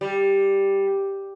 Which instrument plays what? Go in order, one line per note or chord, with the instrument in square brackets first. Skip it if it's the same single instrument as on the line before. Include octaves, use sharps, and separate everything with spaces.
[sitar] G3